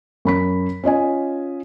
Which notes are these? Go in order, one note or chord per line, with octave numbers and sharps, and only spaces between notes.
F#2 B5 B6
C#4 F4 D#5 G#5